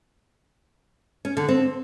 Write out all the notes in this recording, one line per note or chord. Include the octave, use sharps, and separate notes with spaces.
C#4
D3
C4